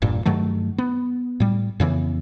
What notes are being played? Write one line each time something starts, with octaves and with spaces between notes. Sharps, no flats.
E1 G2 A#2
G2 D#3 F#3 A3
B3
A2 G3
F2 C#3 E3 B3